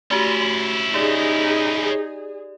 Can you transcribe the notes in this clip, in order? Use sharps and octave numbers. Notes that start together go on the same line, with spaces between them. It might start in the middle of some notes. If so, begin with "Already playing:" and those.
A3 C#4 E4 F#4 G4
D#4 G4 G#4 D5